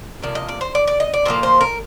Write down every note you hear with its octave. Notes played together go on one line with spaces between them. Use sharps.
C3 F3 A#3 D5
D#5
D5
C5
D5
D5
D#5
D5
A#2 F3 A#3 C5
C5
A#4